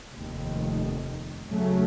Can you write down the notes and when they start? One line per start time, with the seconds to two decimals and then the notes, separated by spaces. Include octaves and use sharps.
0.13 F1 D#2 D#3
1.50 D#2 C#3 F#3 A3